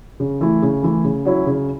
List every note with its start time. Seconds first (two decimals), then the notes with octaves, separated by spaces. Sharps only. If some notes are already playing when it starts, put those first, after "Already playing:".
0.20 C#3
0.40 E3 A3 E4
0.62 C#3
0.83 E3 A3 E4
1.04 C#3
1.25 F#3 C#4 E4
1.47 C#3